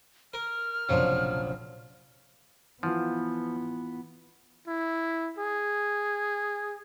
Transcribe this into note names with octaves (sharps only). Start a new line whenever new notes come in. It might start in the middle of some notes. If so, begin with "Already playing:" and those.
A#4 F6
F1 A#1 C#3 F3 F#3
E3 F3 B3 F4 F#5
E4
G#4